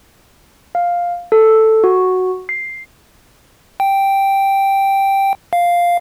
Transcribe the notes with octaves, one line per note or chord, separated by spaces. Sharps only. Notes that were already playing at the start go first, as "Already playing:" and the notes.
F5
A4
F#4
C7
G5
F5